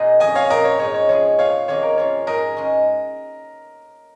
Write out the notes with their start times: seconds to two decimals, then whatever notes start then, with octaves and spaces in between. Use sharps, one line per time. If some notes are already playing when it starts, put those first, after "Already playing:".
Already playing: A#2 G#3 D#4 G#4 D#5
0.20 F2 F3 C#4 D#5 G#5
0.35 C#5 F5
0.49 A#2 F3 C#4 A#4 D#5
0.64 C#5
0.79 G#2 G#3 D#4 C#5
0.94 C#5
1.09 F3 G#3 C#4 G#4 C#5
1.39 A#2 F3 C#4 G#4 C#5 F5
1.68 F2 D#3 A#3 D#4 G#4 C#5
1.83 A#4
1.97 F3 C#4 F4 C#5
2.27 G#2 G#3 D#4 G#4 A#4 D#5
2.57 G#2 G#3 C#4